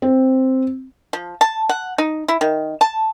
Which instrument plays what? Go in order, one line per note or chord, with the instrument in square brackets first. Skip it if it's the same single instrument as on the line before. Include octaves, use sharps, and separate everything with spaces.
[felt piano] C4
[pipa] F3
A5
F#5
D#4
E4
D#3
A5